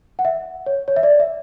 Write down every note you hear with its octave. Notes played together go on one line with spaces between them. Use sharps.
F#5
E5
C#5
C#5
E5
D5
E5